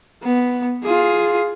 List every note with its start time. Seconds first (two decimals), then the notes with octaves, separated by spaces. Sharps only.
0.23 B3
0.83 F4 G#4